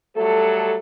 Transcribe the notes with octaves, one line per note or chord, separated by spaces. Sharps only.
F#3 G3 A3 A4